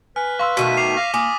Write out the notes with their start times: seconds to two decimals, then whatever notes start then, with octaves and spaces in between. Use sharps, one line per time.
0.16 B4 G#5 F6
0.39 F5 C6 C#6 E6
0.57 B2 D#3 A3 B6 D#7
0.77 D6 C7 F7
0.97 F5 A#6
1.14 A#3 F4 G#5 D6 D#6